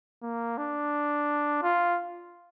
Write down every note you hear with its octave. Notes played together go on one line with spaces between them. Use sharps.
A#3
D4
F4